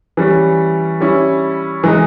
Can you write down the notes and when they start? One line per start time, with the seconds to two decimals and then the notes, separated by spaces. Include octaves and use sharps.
0.17 E3 G3 C#4
1.00 G3 C#4 E4
1.84 E3 G#3 D#4